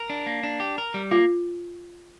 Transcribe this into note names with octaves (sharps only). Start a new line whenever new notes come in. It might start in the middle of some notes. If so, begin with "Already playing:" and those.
Already playing: A#4
D4
A#3
D4
G4
A#4
G3
A#3 F4